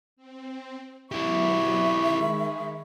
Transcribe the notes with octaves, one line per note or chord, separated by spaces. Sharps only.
C4
F#3 B3 E4 G4 E5 B5 C#6
D#3 G#3